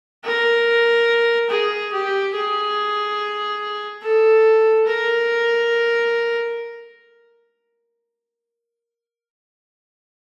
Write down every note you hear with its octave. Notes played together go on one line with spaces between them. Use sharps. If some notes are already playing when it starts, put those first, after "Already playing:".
A#4
G#4
G4
G#4
A4
A#4